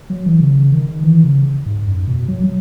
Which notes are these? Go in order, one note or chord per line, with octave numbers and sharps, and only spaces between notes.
F#3
E3
C#3
D#3
E3
C#3
G#2
F#2
B2
F#3
F#3